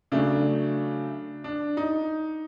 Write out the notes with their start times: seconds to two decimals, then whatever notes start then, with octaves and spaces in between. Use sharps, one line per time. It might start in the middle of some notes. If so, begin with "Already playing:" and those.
0.12 C#3 F#3 A3 D4
1.44 D4
1.77 D#4